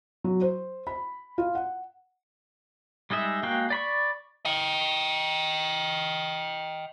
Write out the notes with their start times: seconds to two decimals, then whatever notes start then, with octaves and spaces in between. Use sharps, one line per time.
0.24 F#3
0.41 C5
0.87 B5
1.38 F4
1.55 F#5
3.10 G3 G#3 D#4 E5
3.43 G#3 A#3 F#4 F5 G5
3.70 D5 B5 C#6
4.45 D#5 G5